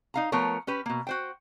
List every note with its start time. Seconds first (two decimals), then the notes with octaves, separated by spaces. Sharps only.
0.14 D#4 F5 A#5
0.32 F3 A3 B3 A#4 C#5
0.67 C#4 G4 B4
0.86 B2 A#3
1.07 F#4 C5 G5